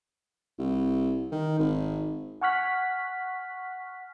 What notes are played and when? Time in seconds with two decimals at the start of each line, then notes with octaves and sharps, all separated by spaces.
0.59 C2
1.32 D#3
1.59 G#1
2.41 F#5 G#5 C#6 F6 F#6 B6